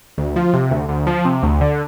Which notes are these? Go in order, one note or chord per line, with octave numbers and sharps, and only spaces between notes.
D2
F3
C3
D2
D2
F3
C3
D2
D3